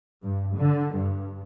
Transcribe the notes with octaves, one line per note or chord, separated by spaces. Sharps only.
G2
D3
G2